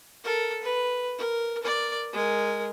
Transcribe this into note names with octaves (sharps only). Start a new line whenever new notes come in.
A4 A#4
B4
A#4
A#4 D5
G#3 A#4